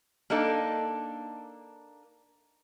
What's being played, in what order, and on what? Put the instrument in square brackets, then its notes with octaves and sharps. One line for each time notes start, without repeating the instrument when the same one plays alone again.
[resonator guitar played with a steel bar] A#3 D4 D#4 A4